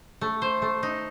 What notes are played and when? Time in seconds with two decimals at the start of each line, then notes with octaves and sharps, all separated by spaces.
0.21 A3
0.42 C5
0.62 A3
0.83 D#4